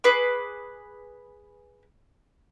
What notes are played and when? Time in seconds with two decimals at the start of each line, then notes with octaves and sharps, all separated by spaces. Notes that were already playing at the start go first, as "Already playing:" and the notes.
0.04 G#4 B4 D6